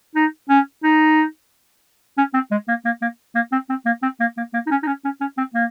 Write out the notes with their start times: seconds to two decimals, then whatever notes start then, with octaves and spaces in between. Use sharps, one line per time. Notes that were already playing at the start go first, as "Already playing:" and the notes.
0.15 D#4
0.49 C#4
0.83 D#4
2.18 C#4
2.34 C4
2.51 G#3
2.68 A#3
2.85 A#3
3.02 A#3
3.35 A#3
3.52 C4
3.70 C4
3.86 A#3
4.02 C4
4.20 A#3
4.37 A#3
4.54 A#3
4.67 D#4
4.71 C#4
4.83 D#4
4.87 C#4
5.04 C#4
5.21 C#4
5.38 C4
5.54 A#3